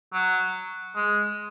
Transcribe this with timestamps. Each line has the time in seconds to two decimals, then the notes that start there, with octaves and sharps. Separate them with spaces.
0.13 F#3
0.96 G#3